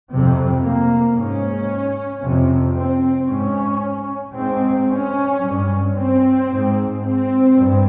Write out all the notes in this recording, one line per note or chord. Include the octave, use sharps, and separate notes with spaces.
F2 C3
A#3
G#2 C#4
F2 C3
C4
G#2 C#4
G#2 C4
C#4
G2
C4
G#2
C4
G2